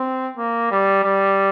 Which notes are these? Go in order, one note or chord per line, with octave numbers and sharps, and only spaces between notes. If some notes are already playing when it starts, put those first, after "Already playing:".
Already playing: C4
A#3
G3
G3